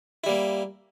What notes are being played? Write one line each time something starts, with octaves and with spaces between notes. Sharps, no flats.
G3 A#3 E4